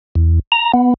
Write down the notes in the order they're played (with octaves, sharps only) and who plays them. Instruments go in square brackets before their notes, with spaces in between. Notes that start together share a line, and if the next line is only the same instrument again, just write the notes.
[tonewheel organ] E2
A#5
B3